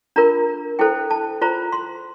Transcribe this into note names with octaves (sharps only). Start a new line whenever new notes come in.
D4 F4 A#4 A#5
E4 A4 C5 G5
A5
F4 C5 A#5
C6